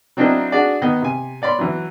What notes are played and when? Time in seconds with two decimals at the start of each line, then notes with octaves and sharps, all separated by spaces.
0.17 F#3 C4 D4 E4 A#4 D#5
0.52 D4 F#4 G#4 D5
0.82 D#3 B3 D#5
1.02 C3 G#5
1.42 C#5 D5 B5 C6
1.59 E3 F#3